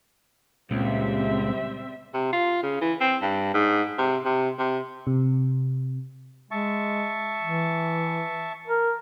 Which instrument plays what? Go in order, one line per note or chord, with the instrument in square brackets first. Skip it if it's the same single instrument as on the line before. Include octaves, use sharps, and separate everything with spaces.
[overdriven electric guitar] C#2 [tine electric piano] A#2 [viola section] G3 C4 E5
[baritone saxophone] C3
F4
C#3
E3
C4
G2
G#2
C3
C3
C3
[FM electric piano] C3
[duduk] G#3 [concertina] E5 A5 C#6
[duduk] E3
A#4